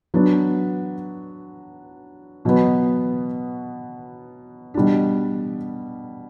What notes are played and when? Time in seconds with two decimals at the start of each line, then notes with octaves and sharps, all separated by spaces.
0.14 F#3 B3 D4
2.45 B2 F#3 B3
4.74 B2 G3 D4